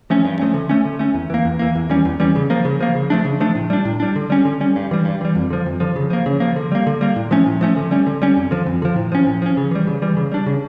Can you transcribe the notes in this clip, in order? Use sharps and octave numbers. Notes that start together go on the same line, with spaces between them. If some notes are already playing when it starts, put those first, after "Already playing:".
F3 A3 C#4
G2
F3 A3 C#4
D3
A3 C#4
D3
A3 C#4
E2
E3 A#3
E2
E3 A#3
E2
E3 G3 C#4
E2
E3 G3 C#4
C#3
F3 A#3
C#3
F3 A#3
C#3
F3 A3 D4
C#3
F3 A3 D4
A2
G3 D4
A2
G3 D4
D3
G3 C#4
D3
G3 C#4
G2
E3 G3
G2
E3 G3
F2
D3 F3
F2
D3 F3
C#3
F3 A#3
C#3
F3 A#3
D3
G3 A#3
D3
G3 A#3
A2
F3 A3 C#4
A2
F3 A3 C#4
D3
G3 C#4
D3
G3 C#4
F2
D3 F3
F2
D3 F3
A2
F3 C#4
A2
F3 C#4
C#3
E3 G3
C#3
E3 G3
C#3
G3 D4
C#3